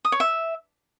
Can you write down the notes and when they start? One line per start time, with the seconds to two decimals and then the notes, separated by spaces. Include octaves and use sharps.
0.05 D#6
0.12 C#5
0.20 E5